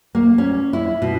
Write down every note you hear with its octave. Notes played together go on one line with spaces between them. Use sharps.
A#3
C#4
E4
B2